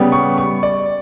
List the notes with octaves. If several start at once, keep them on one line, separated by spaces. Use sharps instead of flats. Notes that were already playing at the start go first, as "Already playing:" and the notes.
Already playing: C#3 G3 B3
C#6
C#6
D5